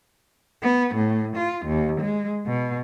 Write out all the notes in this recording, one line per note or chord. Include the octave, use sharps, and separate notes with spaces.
B3
A2
F4
D#2
G#3
B2